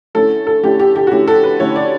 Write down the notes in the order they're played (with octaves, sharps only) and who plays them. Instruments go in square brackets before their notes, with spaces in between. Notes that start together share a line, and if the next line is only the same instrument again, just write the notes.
[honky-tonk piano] D3 A3 C#4 E4 A4
A4
D3 A3 C#4 E4 G4
G4
G4
F#4
D3 A3 C#4 E4 G4
A4
B4
D3 A3 C#4 E4 C#5
D5